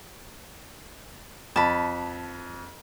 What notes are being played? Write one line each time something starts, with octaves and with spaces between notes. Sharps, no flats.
F2 A5 B5